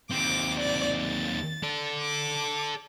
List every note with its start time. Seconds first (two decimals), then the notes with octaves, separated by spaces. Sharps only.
0.11 D#2 C4 D6
0.60 D5
0.98 A6
1.63 A4 D5
2.01 D6